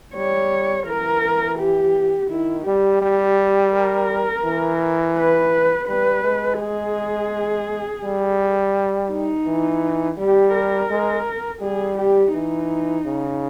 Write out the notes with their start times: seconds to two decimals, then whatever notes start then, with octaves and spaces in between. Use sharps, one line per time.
0.15 G3 C#5
0.86 E3 A#4
1.58 G4
2.30 D#3 E4
2.66 G3 G4
3.02 G3
3.73 A#4
4.44 E3
5.17 B4
5.88 G3 B4
6.24 G#3
6.60 G#4
8.04 G3
9.11 D#4
9.46 E3
10.18 G3 G4
10.54 A#4
10.91 G#3
11.62 G3 G#4
11.98 G4
12.33 E3 D#4
13.06 C#3